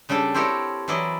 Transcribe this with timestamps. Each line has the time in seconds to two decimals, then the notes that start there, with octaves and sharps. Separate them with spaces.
0.09 C#3 G3 D4 G4 A4
0.34 C4 E4 G4 A4 A#4 C#5
0.88 E3 F#3 E4 D5 D#5